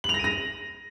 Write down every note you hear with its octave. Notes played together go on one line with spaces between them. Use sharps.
F#7
F7
A#6
D#7
A#6